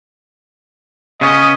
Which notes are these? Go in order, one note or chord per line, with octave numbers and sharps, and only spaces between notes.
C#3 B3 C#4 D#5